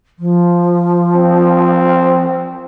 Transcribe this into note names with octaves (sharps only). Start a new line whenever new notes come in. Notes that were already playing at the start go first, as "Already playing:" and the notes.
F3
C4